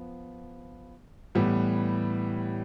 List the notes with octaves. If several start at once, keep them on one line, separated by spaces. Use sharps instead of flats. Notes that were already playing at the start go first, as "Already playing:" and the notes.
Already playing: F3 B3
A2 E3 G3 B3